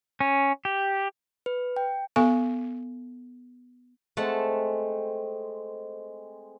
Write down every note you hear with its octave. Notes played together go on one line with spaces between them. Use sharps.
C#4
G4
B4
G5
B3 A4 G#5 C#6
G#3 A3 C4 F#5 A5